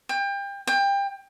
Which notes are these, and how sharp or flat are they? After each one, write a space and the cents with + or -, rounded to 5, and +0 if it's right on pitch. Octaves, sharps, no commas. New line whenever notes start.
G5 +30
G5 +25